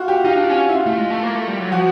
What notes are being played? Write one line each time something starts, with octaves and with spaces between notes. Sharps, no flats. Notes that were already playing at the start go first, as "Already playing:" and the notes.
Already playing: F4 F#4
G4
D#4 F4
D4
C#4
E4
F4
A3
G#3
A3
A#3
A3
G3
F#3
F3 F#4